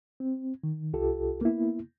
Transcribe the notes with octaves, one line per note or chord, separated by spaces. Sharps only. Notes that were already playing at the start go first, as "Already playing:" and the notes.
C4
D#3
C2 F4 G4 A4
A#3 B3 E4